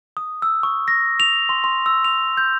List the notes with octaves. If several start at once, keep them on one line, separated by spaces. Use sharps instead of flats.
D#6
E6
C#6
A#6
F7
C6
C6
E6
F7
G6